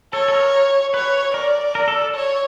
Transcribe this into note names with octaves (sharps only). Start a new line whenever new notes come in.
A4 C#5
A4
A#4
B4 C#5
A#4 D5
A#4
A4
A4
C#5